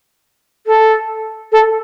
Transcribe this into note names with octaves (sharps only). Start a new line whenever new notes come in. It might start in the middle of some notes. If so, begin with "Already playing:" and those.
A4
A4